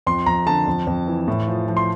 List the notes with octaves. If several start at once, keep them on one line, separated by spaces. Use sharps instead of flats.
F2 C6
F2 A#5
D3 A5
F2
F2
E3
A2
F3
F3
C6